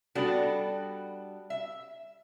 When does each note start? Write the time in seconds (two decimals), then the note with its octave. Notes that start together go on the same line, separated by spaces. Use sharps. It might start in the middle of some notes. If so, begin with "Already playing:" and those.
0.15 G3 B3 D4 F#4 A4
1.50 E5